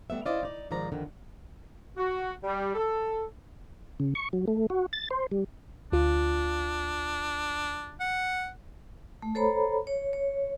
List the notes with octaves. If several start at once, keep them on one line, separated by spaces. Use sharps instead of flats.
G3 A3 B3 E5
C#4 E4 C5 D5 D#5 F5
D#4 D5
G#2 D#3 F3 D5 A#5
F2 D3 D#3
F#4
G3
A4
C#3
C#6
F#3
A3
F#4
A6
C5
G3
D2 D4 F4
F#5
A3
A4 C5 C#5 A#5 B5
C#5
C#5